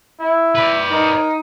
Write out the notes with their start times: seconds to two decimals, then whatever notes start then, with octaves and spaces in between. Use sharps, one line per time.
0.20 E4
0.55 B4 D5
0.90 D#4 A#4